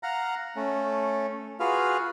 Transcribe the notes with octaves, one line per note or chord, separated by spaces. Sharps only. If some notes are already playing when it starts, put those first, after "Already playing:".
F5 F#5 A#5
A3 C#4
F4 F#4 G#4 B4 F5